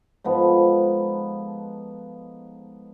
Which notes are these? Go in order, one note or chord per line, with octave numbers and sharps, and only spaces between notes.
G#2 F3 B3 A4